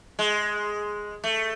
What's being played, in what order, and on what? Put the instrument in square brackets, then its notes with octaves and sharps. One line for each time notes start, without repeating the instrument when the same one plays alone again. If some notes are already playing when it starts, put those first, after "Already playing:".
[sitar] G#3
A3